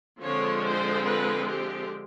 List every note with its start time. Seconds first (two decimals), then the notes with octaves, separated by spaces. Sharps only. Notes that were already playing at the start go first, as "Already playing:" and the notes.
0.20 D3 F3 G#3 C4 C#5
0.63 C5
1.05 B4
1.47 G4